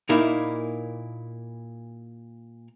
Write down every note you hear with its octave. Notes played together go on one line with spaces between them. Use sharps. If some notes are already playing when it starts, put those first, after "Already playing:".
A#2 A#3 D#4 E4